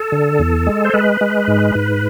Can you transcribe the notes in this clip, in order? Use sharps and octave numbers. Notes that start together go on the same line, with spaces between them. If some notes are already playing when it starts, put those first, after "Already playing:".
Already playing: A4
D3
E2
G#3
C5
G#3 B4
G#3
G#2
G#2